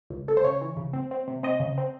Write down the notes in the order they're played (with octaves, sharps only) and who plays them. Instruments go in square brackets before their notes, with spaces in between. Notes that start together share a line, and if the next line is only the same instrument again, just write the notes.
[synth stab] C#2
C#2 A4
C5
C#3 C#5
E3
C#3
C4
C4
C3
C4 D#5
C#3
C4